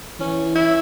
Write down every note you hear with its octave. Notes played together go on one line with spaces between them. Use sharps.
E3 C#4
E4